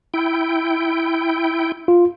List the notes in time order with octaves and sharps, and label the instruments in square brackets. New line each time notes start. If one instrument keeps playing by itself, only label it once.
[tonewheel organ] E4 G5
[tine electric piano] F4